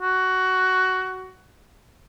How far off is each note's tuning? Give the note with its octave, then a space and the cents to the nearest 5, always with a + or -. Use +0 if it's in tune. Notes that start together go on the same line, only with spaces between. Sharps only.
F#4 +15